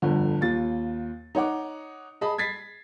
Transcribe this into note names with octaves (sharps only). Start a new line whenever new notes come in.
G1 F2 D3
D#2 F4 A6
D#4 C#5 F#5 D6
G#4 D#5 A5 B5
G#6 A6 B6 C7